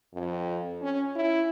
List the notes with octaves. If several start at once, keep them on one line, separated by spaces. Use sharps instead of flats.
F2
C#4
E4